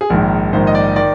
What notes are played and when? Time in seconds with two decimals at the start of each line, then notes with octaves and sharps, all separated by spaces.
0.01 G#4
0.10 A#1 G#2 D#3 A#4
0.53 A#1 G#2 D#3 C5
0.67 D#5
0.75 D5
0.96 D#3 D5